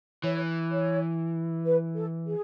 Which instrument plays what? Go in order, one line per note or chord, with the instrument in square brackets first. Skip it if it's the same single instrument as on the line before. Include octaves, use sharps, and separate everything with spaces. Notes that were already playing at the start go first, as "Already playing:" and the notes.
[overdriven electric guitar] E3 [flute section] C#5
[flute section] C#5
B4
A4
G#4